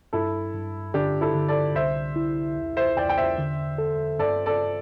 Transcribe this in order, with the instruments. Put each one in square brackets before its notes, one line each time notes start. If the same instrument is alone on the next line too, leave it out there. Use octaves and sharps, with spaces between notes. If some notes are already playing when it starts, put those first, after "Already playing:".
[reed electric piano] G2 [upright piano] E4 A4
[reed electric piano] G2
[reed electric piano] D3 [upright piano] D4 G4
[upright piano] E4 A4
[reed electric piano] D3
[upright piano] A4 D5
[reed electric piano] C2 [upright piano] C5 E5
[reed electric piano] E4
E2
[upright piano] C5 E5
[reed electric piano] E2 [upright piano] D5 G5
[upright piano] G5
C5 E5
[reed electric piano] D3
A4
[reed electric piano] G2 [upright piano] A4 D5
[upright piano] A4 D5